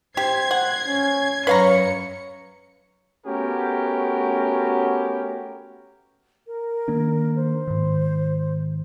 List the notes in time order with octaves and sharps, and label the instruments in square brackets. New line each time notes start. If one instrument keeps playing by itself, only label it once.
[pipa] G4 [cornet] C5 [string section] G#6 C7
[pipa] F#5
[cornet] C#4
[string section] F#2 C#7 [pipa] B4 F5 A#5 [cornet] C#5
[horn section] A3 B3 C#4 F#4 G4 A#4
[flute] A#4
[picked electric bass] D#3 A#3 D4
[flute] C5
[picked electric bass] G#2 D#3